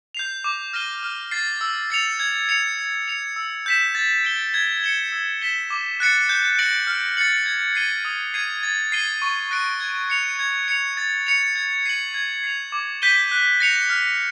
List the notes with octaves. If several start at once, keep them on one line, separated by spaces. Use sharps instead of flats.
G6 C7 F7
D6
F6 A#6 D#7 G7
F6
A6 C7
E6
A6 C#7 F7
G#6
C#7 F7
A6
C#7 F7
E6
G6 B6 E7
A6
D7 G7
G#6
C#7 E7 G7
E6
G#6 B6 E7 G7
D6
F#6 A6 C#7
G6
A#6 D7 F#7
F6
A6 C#7 F#7
G#6
C7 D#7 G7
D#6
G#6 C7 D#7
A6
C7 D#7 G7
C#6
F#6 A#6 D7
G#6
C#7 F7
G#6
C#7 F7
A6
C#7 F7
G#6
C7 D#7 F#7
G#6
C7 F7
D6
G6 B6 D#7 G7
F#6
A#6 C#7 F7
F6